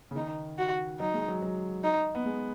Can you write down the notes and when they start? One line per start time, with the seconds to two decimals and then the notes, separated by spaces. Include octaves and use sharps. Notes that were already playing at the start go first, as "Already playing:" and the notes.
0.11 C#3
0.16 D#3 D#4
0.58 F#4
1.00 F#3 D#4
1.14 G#3
1.28 F#3
1.42 F#3
1.84 D#4
2.15 B3
2.25 G#3